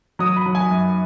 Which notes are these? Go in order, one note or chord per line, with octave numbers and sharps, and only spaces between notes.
F#3 D#6
B5
F#3
G#5
F#2